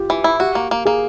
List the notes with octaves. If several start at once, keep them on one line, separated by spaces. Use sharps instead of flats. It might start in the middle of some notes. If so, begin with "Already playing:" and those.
Already playing: F4 G4
E3
E4
F#4 G4
A#3
A#3
A#3 G#4